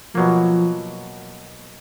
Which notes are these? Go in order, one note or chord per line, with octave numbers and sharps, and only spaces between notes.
B2 F3 F#3 A#3